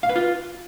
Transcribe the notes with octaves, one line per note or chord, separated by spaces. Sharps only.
F5
B4
F4